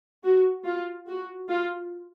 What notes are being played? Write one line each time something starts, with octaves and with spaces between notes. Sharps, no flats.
F#4
F4
F#4
F4